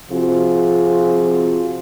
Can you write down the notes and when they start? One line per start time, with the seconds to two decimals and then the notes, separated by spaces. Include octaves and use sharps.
0.11 C3 F3 C4 F4 F#4 G#4